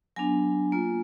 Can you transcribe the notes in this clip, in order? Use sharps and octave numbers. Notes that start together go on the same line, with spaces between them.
F#3 B3 D4 G#5
A#3 F4